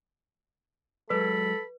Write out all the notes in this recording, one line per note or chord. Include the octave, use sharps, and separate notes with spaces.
F#3 G#3 A4 B4 D5 B5